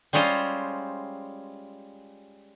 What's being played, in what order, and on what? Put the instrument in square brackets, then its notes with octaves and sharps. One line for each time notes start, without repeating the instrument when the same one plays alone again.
[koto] G3 G#3 C#4 F4 C5